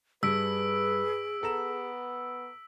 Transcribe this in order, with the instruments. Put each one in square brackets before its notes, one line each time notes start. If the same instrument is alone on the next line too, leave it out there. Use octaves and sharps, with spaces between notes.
[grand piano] G2 [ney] G#4 [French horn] B4 [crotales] E6 B6 D7
[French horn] B3 [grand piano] A4 A#5 E7